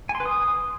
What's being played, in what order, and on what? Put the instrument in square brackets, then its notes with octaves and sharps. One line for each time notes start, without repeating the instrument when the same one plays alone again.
[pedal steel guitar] G#5
C6
B4
D#6